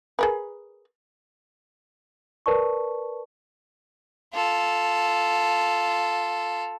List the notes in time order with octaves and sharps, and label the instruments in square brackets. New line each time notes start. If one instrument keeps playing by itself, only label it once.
[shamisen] G#4 A#4 B4
[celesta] A#4 B4 D5 A5 C#6
[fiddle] F4 A4